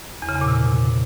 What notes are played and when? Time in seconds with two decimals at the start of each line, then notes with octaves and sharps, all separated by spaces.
0.22 E2
0.29 C#3
0.35 E2
0.41 A#2
0.48 C3